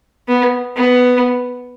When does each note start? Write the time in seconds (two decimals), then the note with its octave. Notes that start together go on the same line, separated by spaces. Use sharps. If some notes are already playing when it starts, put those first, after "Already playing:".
0.28 B3
0.76 B3